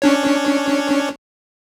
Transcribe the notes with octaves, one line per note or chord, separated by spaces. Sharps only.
C#4 D4 C#5